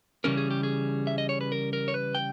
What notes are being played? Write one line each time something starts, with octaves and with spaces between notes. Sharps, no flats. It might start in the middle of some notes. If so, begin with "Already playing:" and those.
C#3 E3 G3 C#4 A#4
G#4
G4
G#4
E5
D#5
C#5
B4
A#4
A#4
C#5
B4
G5